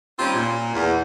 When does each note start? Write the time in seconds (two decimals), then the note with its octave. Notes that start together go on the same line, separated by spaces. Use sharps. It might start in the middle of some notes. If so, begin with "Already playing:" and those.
0.19 D#2 G3 C4 C#4 D#4 F4
0.35 A#2
0.74 E2